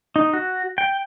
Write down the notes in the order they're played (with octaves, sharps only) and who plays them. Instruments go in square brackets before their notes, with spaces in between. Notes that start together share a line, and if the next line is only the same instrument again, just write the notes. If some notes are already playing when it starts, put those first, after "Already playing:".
[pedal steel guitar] D#4
F#4
G5